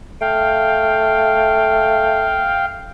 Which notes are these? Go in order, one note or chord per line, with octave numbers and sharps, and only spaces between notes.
A3 F5 G5